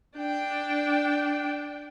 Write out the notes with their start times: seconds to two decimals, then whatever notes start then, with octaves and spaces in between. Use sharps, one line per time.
0.17 D4 G5